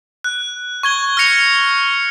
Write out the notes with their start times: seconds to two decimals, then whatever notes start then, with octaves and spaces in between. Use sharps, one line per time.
0.24 F#6
0.83 C#6 G#6 G7
1.17 F6 G#6 A#6 C#7 F7